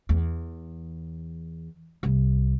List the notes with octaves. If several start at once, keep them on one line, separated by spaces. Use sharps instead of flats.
E2
C2